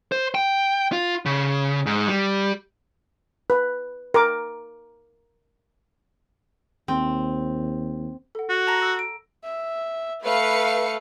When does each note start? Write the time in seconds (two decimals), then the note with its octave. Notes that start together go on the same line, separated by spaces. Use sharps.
0.12 C5
0.35 G5
0.93 F4
1.26 C#3
1.86 G#2
2.08 G3
3.50 B4
4.14 A#4 D6
6.88 D#2 C4
8.35 A4 F#5
8.49 F#4
8.67 A5 A#5 A#6
8.82 E6
8.99 D7
9.44 E5
10.23 A3 B4 F5 C#7